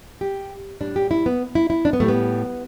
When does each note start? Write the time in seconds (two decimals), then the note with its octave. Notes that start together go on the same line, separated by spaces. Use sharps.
0.21 G4
0.80 A2 G3 D4
0.96 G4
1.11 E4
1.26 B3
1.55 E4
1.70 E4
1.85 D4
1.93 B3
2.00 A2 G3 A3
2.08 B3